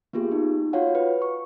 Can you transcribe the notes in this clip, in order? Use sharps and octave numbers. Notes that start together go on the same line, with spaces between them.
A#3 B3 F4 G4 G#4
D#4
F4 F#4 C#5 F5 F#5
B4
C#6